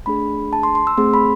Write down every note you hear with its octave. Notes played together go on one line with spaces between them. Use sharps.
A3 D4 G#4 B5
A5
C6
C6
E6
A3 C4 G#4 C6
B5